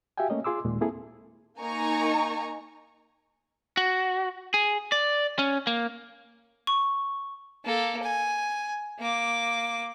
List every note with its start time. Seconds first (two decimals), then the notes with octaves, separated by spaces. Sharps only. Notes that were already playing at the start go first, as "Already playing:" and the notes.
0.18 F#4 G4 E5 F5 G5 G#5
0.30 A3 A#3 C#4 C#5 D#5
0.44 F4 G#4 C6 D6 E6
0.65 D#2 A#2 D#3 G#3
0.81 A#3 C4 E4 G#4 A4
1.59 A#3 D#4 G#5 A#5 C#6
3.77 F#4
4.54 G#4
4.92 D5
5.39 C#4
5.67 A#3
6.67 C#6
7.65 A#3 A4
8.02 G#5
8.99 A#3 D6